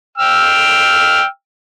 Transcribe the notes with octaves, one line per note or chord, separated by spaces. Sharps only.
G5 E6 F6